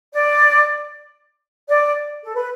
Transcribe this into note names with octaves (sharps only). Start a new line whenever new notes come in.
D5
D5
A4
B4